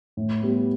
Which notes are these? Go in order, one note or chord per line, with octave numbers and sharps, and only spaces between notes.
A2
G3 B3